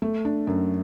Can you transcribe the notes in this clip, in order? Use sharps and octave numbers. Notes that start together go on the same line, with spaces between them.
A3
D4
F#2